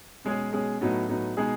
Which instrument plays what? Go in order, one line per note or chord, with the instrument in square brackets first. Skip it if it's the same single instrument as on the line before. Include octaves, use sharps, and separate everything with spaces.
[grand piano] B2 G#3 C#4 G#4
B2 G#3 C#4 G#4
A2 F#3 B3 D#4
A2 F#3 B3 D#4
B2 G#3 D#4 G#4